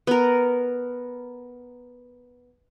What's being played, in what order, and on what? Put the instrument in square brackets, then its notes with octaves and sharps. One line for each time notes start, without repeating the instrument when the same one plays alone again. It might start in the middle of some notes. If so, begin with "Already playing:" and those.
[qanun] B3 A#4